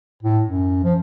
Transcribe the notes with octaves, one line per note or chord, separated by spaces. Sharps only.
A2
F#2
F3